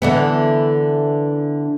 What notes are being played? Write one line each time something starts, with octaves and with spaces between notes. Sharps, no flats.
D3 E3 B3